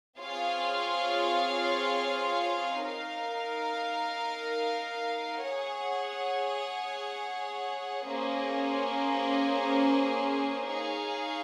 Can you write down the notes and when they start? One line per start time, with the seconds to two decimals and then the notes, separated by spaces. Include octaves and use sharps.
0.19 C4 F4 G#4 C#5 F5
2.81 D#4 A#4 F5
5.43 G#4 C#5 F#5
8.05 A#3 C#4 G#4 C5
10.67 D#4 G#4 C#5 F5